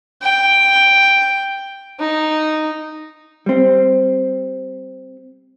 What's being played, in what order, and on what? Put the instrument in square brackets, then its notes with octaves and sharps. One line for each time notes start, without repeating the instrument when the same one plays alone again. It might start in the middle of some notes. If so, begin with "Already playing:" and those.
[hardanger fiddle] G5
D#4
[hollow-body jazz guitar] G3 C4